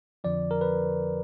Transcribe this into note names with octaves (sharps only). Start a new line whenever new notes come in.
F2 D3 F3 D5
A#4
B4